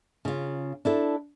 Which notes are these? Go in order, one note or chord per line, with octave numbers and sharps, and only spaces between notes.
C#3 F4
D4 E4 A4